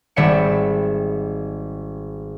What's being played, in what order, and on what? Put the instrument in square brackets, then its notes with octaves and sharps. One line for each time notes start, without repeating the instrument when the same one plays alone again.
[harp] G#1 G3 E5 C#7